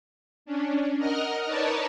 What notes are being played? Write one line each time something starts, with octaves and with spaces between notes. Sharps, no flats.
C#4 D4
A#4 D#5 F#5 F6
D#4 A#4 B4 C#5 D5 A5